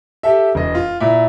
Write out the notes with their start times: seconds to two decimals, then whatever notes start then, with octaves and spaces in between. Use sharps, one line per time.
0.23 G4 A4 E5
0.55 E1 D#5
0.75 F4
1.00 A#2 E4